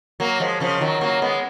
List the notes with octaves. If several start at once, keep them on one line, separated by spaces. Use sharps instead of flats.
F#3 A#3
F3 G#3
C#3 F3
D#3 F#3
F#3 A#3
G#3 B3